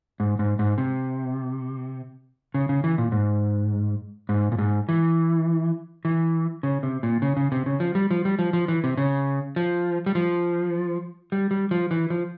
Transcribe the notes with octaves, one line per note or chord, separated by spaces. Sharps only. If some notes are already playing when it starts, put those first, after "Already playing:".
G#2
G#2
G#2
C3
C#3
C#3
E3
A#2
G#2
G#2
A#2
G#2
E3
E3
C#3
C3
A#2
C#3
C#3
C3
C#3
F3
G3
F3
G3
F3
F3
E3
C3
C#3
F3
G3
F3
G3
G3
F3
E3
F3